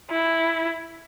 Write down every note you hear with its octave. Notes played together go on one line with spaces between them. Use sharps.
E4